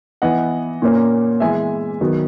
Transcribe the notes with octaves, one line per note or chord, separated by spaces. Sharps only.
E3 B3 D#5 F#5
A#2 A#3 C#4
E3 G#3 B3 E5 G#5
D#3 F#3 B3